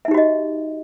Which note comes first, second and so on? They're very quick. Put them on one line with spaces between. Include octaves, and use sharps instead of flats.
E5 D#4 G4 F#4 D#5